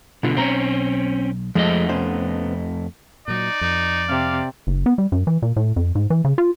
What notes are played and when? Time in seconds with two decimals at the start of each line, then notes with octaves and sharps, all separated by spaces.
0.23 B1 B2 D3 F4 B4
0.37 B1 C4 C#4 A#5
1.55 F2 F3 G#3 A3 D#5
1.89 B3 C#4 C5
3.28 A#2 F#3 D#4 D5
3.61 F2 D#4
4.09 C3 F5
4.67 F#1
4.86 B3
4.98 G3
5.12 F#2
5.27 E3
5.42 A#2
5.56 A2
5.76 F2
5.95 G#2
6.10 E3
6.25 C#3
6.38 F4